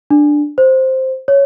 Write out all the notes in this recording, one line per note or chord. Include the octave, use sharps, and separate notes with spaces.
D4
C5
C#5